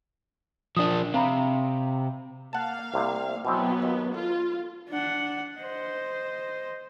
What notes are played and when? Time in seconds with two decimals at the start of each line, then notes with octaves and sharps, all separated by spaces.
0.77 F3 D4 D#6
1.14 C3 F5 A#5 B5
2.53 A#3 F5 F#5 A5
2.94 C2 C3
3.45 B2 E3 F#3 B3 C4
3.82 D#2
4.14 F4 A4
4.89 D4 F#5
5.58 C5 D#5